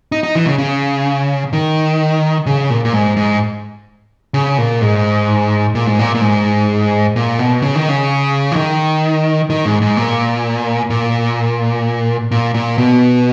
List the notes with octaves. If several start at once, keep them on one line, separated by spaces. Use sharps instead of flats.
D#4
D#4
E3
C#3
C#3
D#3
C#3
A#2
A#2
G#2
G#2
C#3
A#2
G#2
A#2
G#2
A#2
A#2
G#2
A#2
B2
C#3
D#3
C#3
E3
D#3
D#3
G#2
G#2
A#2
A#2
A#2
A#2
B2